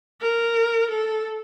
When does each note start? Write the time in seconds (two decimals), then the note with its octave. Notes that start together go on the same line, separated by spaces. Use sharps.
0.21 A#4
0.91 A4